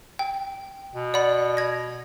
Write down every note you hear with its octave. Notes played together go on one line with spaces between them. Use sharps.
G5
B2
D5 F#5 B5
G#6 A#6